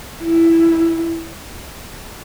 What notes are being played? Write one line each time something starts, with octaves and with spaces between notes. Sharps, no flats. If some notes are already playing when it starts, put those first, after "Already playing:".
E4